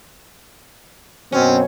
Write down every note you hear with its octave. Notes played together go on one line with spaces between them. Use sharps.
F#2 B2 C4 C#4